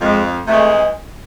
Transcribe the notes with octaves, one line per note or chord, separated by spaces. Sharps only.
F2 G#3
C3 E3 G#3 A3